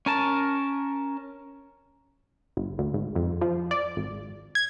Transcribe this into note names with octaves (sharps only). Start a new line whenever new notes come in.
C#4 A#4 A5
G1
D2
G#1
F2
F3
D5
G#1
G#6